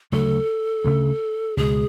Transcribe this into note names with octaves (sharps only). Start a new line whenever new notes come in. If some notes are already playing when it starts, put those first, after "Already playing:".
D2 C#3 F#3 A3 A4
D2 C#3 F#3 A3
C#2 B2 G#3 G#4